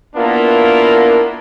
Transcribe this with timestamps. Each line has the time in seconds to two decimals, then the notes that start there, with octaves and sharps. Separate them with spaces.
0.16 A#3 B3 D4 E4 F4 A#4